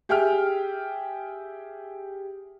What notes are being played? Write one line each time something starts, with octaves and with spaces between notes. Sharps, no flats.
G4 G#4 E5 G5 G#5 F6